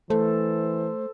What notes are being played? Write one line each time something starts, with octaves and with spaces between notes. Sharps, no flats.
E3 A3 A4 C5